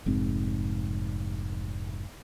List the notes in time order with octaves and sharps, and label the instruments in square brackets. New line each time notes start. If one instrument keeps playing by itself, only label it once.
[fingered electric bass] F1 G#2 C4